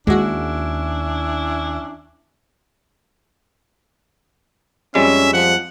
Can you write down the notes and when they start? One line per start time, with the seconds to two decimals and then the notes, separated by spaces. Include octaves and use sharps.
0.07 D#2 G#3 C#4 D4 E4 F#4
4.95 F2 G3 G#3 C#4 E5
5.34 F3 F#5